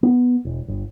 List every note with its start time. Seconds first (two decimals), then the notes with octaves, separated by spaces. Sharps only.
0.03 B3
0.45 E1
0.68 G1